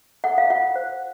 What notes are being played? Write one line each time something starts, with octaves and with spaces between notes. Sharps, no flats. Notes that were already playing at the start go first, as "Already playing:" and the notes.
A4 F#5
F5
F4 F#5
C5